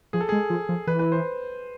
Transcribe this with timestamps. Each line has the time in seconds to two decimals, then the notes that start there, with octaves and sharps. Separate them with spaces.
0.13 F3 G#4
0.21 A4
0.29 G#3 G#4
0.50 F3
0.69 F3
0.87 E3 B4
0.99 B4
1.12 C5